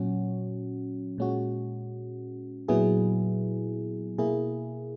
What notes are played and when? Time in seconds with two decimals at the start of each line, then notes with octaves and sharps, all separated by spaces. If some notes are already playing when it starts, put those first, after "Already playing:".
Already playing: A#2 F#3 C#4 F#4
1.18 A#2 G#3 C#4 F#4
2.68 A#2 F#3 B3 E4 G#4
4.18 B2 A#3 E4 G#4